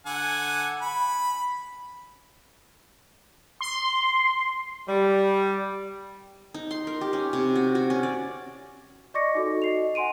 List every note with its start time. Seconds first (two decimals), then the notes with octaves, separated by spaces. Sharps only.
0.06 D3 F#5 G#5
0.82 B5
3.61 C6
4.88 G3
6.54 D#4
6.71 C6
6.87 A#4
7.01 G4
7.13 C#4
7.33 C3
7.56 F#4
7.75 F#4
7.90 C#4
8.03 D5
9.14 D5 D#5 C#6 D6 A#6 C#7
9.35 D#4 F#4 A4
9.62 D#5 C7 F7
9.95 F#5 G#5 C6 D7 D#7